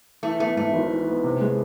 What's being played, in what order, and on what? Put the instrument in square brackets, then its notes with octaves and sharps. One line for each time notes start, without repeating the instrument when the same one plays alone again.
[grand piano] E3 [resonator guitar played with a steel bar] A3
[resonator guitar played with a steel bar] A3 [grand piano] B3
[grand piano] G#2 [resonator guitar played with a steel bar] A3
[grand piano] G#1
E3
B3
C3
G#3